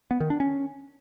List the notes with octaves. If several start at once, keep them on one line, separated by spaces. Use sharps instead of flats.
B3
D#3
D4
C#4